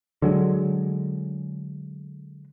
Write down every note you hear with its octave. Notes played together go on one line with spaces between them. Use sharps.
D3 F#3 G#3